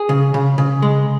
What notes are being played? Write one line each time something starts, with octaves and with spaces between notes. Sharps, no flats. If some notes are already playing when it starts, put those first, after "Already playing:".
Already playing: G#4
C#3
C#3
C#3
G#3